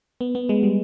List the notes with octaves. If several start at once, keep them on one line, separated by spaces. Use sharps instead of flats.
B3
B3
G#3
G3